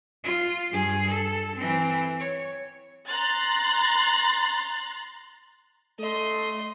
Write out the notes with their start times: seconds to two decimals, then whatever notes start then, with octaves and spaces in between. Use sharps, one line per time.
0.24 F4
0.70 G2 G#4
1.10 A4
1.56 E3 C4
2.19 C#5
3.08 A#5 C6 F#6 A6
5.99 A3 D#5 C6